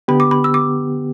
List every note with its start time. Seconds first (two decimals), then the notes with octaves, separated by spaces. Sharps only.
0.08 D3 B3 G4 B5
0.20 D6
0.31 B5
0.44 E6
0.54 D6